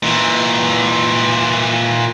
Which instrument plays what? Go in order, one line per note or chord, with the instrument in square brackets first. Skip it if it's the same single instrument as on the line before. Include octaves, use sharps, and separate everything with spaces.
[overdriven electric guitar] A#2 E3